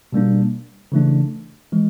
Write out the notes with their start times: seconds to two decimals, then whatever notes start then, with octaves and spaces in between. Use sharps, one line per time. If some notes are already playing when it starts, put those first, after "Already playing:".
0.13 B2 G3 A#3 D4
0.92 C#3 E3 A3 D4
1.72 E3 G#3